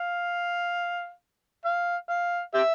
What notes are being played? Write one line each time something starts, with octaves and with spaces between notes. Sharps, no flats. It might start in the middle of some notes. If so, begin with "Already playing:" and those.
Already playing: F5
F5
F5
G4 E5